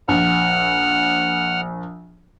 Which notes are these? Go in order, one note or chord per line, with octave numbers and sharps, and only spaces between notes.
A#1 F#5 F6